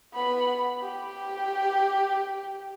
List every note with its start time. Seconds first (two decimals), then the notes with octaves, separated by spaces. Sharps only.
0.14 B3 B5
0.82 G4